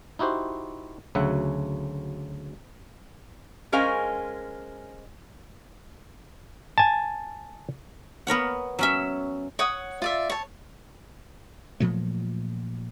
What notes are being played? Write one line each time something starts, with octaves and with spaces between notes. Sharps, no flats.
D#4 E4 F#4 G4 C5
D2 C#3 F#3 E5 F#5
G#3 C#4 A#4 C5 F5 G#5
G#5 A5
B3 A#4 C#5 F#5
F#3 C#4 E5
C#5 F#5 D#6
F4 D5 E5
C#5 A5
A#2 F3 F#3 A3